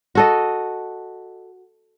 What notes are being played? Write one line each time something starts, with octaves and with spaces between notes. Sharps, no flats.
F#4 A4 D#5